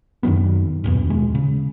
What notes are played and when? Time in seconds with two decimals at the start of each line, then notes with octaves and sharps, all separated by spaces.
0.23 F#2 D#3 F#3 B3
0.84 F#1 D#2 B2
1.10 D#1 G#3
1.35 C#3